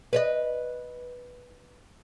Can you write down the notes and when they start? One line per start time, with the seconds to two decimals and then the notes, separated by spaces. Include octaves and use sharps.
0.13 B4 C#5 D#5